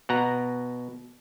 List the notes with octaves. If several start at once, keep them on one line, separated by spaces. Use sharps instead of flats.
B2 F#5 A#5